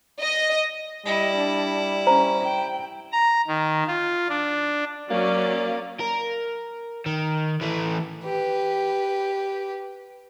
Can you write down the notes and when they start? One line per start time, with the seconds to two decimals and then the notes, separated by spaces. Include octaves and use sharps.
0.19 D#5
1.06 G3 E4 D#5
1.36 D4
2.07 C#4 C5 A#5
2.44 G5
3.12 A#5
3.47 D#3
3.87 F4
4.29 D4
5.10 F#3 A#3 C#4 D5
6.00 A#4
7.06 D#3
7.61 E3 A3
8.24 G4 B4